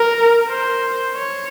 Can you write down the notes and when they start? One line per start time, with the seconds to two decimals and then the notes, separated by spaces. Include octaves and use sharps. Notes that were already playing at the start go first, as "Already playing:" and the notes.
Already playing: A#4
0.49 C5
1.15 C#5